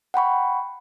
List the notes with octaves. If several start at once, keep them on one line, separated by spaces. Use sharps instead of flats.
F#5 G5 B5 C#6